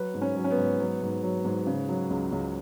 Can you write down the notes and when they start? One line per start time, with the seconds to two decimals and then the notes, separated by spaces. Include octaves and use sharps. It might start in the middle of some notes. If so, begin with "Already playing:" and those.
Already playing: F#3 B4
0.14 G#2
0.22 C#4
0.36 F#3
0.44 C#4
0.51 B3
0.58 G#2
0.80 F#3
1.02 G#2
1.23 F#3
1.45 G#2
1.67 C#3
1.89 F#3
2.10 C#2
2.32 C#2